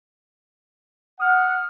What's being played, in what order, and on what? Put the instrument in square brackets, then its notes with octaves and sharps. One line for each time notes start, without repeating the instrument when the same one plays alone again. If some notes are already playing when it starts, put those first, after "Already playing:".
[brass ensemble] F#5 [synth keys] D#6 F6